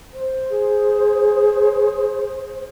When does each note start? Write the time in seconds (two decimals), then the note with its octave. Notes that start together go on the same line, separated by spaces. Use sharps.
0.13 C5
0.50 G#4